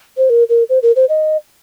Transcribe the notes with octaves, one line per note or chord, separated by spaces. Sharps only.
C5
A#4
A#4
C5
A#4
C5
D#5